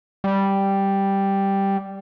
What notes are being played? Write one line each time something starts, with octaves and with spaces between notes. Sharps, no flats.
G3